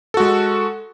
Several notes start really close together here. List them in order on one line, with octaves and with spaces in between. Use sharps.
A4 F#4 G#3